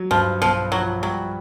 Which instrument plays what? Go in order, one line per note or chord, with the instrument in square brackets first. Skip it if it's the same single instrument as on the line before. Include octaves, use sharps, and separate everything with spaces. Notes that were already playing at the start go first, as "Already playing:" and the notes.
Already playing: [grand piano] F#3
[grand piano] G2 [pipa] F3
[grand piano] B1 [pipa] F3
[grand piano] F3 [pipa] F#3
[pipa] F#3 [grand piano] G3